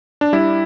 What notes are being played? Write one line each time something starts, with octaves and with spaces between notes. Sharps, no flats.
D4
G3 E4